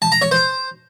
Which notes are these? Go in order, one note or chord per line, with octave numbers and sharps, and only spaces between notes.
A5
A#5
C#5
C5